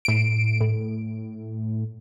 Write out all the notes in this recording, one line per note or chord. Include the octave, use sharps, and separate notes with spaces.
A2 D7
A2